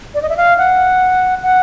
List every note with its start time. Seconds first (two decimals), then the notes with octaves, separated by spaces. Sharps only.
0.14 D5
0.22 D#5
0.29 E5
0.37 F5
0.58 F#5
1.43 F#5